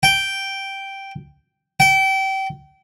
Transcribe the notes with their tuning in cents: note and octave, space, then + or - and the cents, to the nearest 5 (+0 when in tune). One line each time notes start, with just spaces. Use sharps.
G5 -5
G5 -30